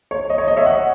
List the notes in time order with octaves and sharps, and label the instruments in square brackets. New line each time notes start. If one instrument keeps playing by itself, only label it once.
[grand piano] C#5
D#5
C#5
D#5
C#5 E5
D#5 F#5